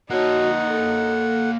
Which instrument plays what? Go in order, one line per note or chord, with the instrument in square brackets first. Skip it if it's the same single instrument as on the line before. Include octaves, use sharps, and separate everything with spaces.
[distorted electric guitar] A#3 C#5 [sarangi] D#4 [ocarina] F#4 [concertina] F#5
[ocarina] A4